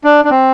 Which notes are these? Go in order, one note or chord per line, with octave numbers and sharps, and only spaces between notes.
D4
D4
C4